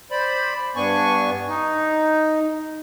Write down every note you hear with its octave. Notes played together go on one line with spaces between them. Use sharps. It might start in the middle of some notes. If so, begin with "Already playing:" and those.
C5 D5 B5
G2 B3 D4 G#5 C#6
D#4